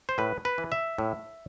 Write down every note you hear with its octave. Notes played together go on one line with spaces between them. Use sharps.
C5
A2 B4
B4
E3
E5
A2